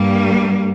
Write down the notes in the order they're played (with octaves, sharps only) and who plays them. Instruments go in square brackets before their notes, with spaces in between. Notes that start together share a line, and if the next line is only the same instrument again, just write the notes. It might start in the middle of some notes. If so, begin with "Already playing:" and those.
Already playing: [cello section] G2 G3 A#3